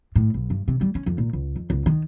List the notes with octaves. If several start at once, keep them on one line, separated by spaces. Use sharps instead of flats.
A2
B1
G2
C3
G3
C#4
F2
A#2
C#2
F2
C#2
D#3